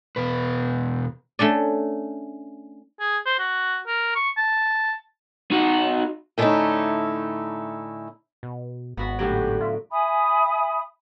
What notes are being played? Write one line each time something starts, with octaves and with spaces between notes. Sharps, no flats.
E2 B2 B4
A3 C#4 D4 D5
G#4
C5
F#4
A#4
C#6
A5
D#4 F#4
A2 D3 A3 C#4 D#4 E4
B2
G#1 B3 F#4 B5
A2 D3 F#3 G4
F4 E5
E5 G#5 B5 D#6